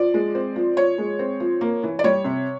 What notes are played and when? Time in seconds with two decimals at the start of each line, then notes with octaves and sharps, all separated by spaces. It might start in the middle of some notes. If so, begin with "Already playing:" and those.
Already playing: F3 D5
0.14 G#3
0.35 C4
0.56 F3
0.77 F3 C#5
0.98 G#3
1.19 C4
1.40 F3
1.61 A#3
1.83 E3
1.99 D5
2.04 G3 C#5
2.24 C3